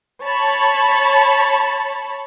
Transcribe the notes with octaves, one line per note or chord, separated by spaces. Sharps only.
C#5 A5 B5